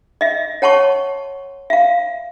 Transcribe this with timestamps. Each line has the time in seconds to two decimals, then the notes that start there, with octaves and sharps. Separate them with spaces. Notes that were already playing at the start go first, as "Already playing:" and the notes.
0.21 D#5 E5
0.62 C#5 F#5 A5 C6 C#6
1.70 E5 F5